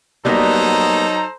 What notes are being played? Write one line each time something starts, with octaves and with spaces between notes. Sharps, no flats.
F#3 G3 A#3 B3 D#4 A4 C5 A#5